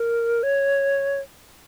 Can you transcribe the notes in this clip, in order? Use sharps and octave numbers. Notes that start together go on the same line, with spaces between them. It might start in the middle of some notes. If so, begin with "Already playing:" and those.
Already playing: A#4
C#5